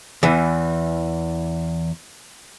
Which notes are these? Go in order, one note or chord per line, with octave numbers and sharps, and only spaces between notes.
E2 E3